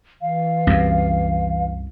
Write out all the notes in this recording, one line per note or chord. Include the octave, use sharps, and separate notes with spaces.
E3 F5
C2 F#2